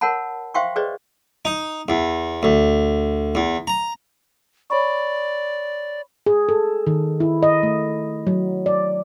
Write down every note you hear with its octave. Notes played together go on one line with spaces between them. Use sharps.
A#4 C#5 F#5 A5 B5
C5 E5 F5 G5 C6 C#6
G#4 B4 C5 D5 D#5
D#4
E2
D2
E2
A#5
C#5 D5 B5 C#6
G#4
A4
D#3
E4
D#5
A3
F#3
D5